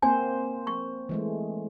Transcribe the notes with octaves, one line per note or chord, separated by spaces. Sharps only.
A#3 C4 C5 G#5
C#6
E3 G#3 A3